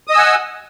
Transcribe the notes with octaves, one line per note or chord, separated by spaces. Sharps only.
D#5 F#5 G#5 D#6 E6